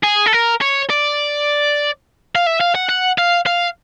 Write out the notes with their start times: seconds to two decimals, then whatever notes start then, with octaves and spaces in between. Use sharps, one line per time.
0.04 G#4
0.26 A4
0.33 A#4
0.61 C#5
0.90 D5
2.36 F5
2.47 E5
2.61 F5
2.75 F#5
2.89 F#5
3.18 F5
3.47 F5